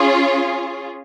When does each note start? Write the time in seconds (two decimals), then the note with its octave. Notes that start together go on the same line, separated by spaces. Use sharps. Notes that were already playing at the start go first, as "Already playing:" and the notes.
Already playing: C#4 F4 G#4